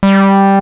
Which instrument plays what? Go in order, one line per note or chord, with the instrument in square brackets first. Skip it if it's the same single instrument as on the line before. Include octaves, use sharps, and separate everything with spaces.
[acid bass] G3